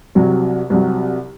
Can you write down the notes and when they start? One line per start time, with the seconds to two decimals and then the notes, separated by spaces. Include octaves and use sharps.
0.15 C2 C3 F#3
0.70 C2 C3 F#3